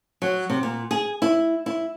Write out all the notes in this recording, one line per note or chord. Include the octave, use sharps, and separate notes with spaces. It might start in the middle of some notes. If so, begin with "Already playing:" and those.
F#3
C3
A#2
G#4
E4
E4